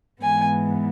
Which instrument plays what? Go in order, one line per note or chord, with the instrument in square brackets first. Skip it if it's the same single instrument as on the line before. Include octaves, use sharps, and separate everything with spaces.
[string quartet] G#2 E3 B3 G#5